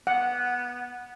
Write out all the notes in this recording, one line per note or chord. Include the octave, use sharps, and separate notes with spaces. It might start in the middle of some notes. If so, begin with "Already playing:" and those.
B3 F#5